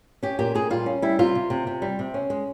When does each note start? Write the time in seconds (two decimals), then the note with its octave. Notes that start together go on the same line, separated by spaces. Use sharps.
0.23 C#4 G4
0.39 A#2 G4
0.55 A#2 G#4
0.70 G3 F4
0.86 C#4
1.02 G3 E4
1.19 C3 F4
1.35 C3
1.50 C3
1.67 C3
1.82 G3
1.99 C3
2.14 C#4
2.30 G#3